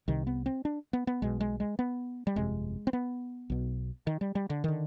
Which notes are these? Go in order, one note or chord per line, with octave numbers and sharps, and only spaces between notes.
C2 C3 D#3
B3
C4
D4
B3
B3
B1 B2 G#3
G#3
G#3
B3
G3
G1 F2 C3 G#3
C4
B3
B1 B2
D#3
G3
G3
D3
D3 D#3